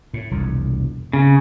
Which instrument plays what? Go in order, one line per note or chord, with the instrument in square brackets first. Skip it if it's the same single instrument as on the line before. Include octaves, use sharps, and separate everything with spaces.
[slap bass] A2
E1 C2 F2
[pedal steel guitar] C#3 [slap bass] C4